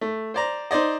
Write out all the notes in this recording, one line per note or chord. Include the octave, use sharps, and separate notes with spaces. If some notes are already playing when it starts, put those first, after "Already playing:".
A3
C5 D5 A#5
D#4 C5 D5 D#5